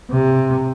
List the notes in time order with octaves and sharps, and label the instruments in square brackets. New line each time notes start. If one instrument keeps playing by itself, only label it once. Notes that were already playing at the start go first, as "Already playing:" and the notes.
[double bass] C3